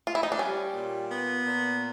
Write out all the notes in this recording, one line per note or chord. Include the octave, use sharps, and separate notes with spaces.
F4
E4
D#4
D4
G3 C#4
A#2
B3
A#2